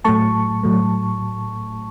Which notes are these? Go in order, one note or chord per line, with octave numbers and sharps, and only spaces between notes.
A2 F#3 A3 A5 C#6
A2 F#3 A3